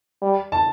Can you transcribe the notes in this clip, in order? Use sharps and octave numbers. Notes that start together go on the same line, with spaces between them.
G3
A5